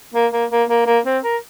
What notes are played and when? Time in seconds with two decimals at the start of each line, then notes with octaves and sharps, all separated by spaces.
0.14 A#3
0.32 A#3
0.51 A#3
0.69 A#3
0.87 A#3
1.06 C4
1.24 A#4